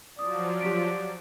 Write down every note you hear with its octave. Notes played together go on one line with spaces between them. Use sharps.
F3 F#3 D5 D#6
G4 B6 D7